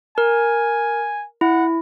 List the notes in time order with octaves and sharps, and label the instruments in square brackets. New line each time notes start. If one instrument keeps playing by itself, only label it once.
[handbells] A#4 [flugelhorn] G#5
[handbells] E4 [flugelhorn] F#5